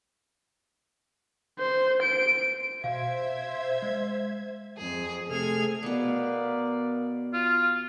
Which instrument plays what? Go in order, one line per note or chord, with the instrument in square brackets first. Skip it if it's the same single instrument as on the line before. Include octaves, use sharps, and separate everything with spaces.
[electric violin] C5
D7
[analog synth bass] B2 [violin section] C5 E5 G#6 [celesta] F5
[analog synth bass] G#3
[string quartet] F2 G#4
C3 A3 G#4 A4 F6 G#6
[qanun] B2 B3 [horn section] A#4 D5 F5
[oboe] F4